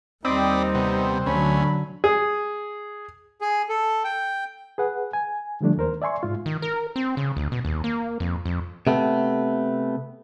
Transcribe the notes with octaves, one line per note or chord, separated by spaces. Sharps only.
D#2 G3 C4 D#4 D5 D#5 B5
C3 B3
D2 D3 F#3 C#4 B5
G#4
G#4
A4
G5
G#4 B4 F#5
G#5
D3 F3 G3 A3 D4
D#2 A#4 C5
D5 E5 G#5 C6 C#6
G#2 F4
D#3
A#4
C4
C#3
D2
B2
D#2
A#3
F2
F2
C3 A3 B3